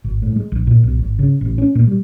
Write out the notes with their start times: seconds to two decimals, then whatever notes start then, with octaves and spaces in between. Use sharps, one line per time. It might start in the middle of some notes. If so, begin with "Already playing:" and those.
0.04 G#1
0.22 A2
0.36 G#3
0.52 A#1
0.67 A#2
0.83 B1
0.99 G#1
1.19 C#3
1.41 A1
1.58 C#4
1.75 A#2
1.87 G3